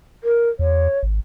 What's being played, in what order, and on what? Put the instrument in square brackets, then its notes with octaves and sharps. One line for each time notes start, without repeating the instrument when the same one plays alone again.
[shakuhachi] A#4
[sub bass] E2 [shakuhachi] C#5
[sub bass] G#1